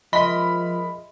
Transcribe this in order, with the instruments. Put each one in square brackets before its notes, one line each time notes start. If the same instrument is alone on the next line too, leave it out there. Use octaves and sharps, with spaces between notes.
[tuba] F3 [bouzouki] G#3 A#4 [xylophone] D#5 E5 C6 [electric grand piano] B5